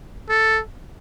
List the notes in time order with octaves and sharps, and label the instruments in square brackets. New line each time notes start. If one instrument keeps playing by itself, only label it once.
[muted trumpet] A4